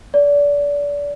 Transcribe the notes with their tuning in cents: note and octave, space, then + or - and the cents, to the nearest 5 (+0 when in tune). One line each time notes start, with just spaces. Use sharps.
D5 -30